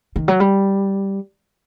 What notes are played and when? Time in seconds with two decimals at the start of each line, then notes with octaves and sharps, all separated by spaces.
0.16 D#3
0.28 F#3
0.40 G3